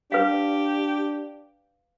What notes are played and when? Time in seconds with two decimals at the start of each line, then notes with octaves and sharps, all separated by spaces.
0.12 D4 G4 B4 F5